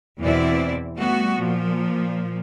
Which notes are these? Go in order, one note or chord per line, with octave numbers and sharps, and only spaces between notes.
E2 B2 E3 C4 E4 D5
G3 A3 B3 F#4
A#2 F3